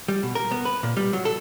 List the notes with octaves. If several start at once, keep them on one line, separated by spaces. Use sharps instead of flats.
G3
B2
A#4
B3
B4
A#2
G3
F#3
A4